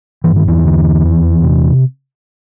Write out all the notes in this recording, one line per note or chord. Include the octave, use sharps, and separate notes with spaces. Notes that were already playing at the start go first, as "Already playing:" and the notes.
G2 E3
D#3
E2 E3
D3
F2
C3